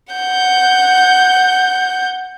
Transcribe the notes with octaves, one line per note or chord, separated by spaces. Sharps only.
F#5 G6